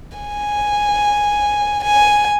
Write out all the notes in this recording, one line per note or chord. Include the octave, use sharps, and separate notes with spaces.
G#5
G#5